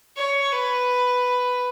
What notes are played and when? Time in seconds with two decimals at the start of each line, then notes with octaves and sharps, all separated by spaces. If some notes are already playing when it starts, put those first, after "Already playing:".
0.16 C#5
0.52 B4